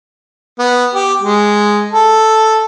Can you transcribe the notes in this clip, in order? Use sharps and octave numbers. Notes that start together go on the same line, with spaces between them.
B3
G4
G#3
A4